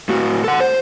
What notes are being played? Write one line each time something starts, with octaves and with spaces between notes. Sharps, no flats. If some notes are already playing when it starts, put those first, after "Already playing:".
A2 F#4
A4 F#5
C5